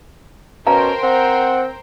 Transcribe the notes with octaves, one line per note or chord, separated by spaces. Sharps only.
B2 C#4 A#4 C5 F5 G5 A5 A#5
C4 F#5